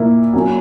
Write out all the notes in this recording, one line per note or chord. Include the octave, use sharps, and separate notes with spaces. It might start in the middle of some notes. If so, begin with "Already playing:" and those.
Already playing: A#2 A#3 E4 A#4
F#3 A#3 C#4